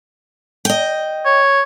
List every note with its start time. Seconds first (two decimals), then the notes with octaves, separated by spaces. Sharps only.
0.65 D#5 G5
1.25 C#5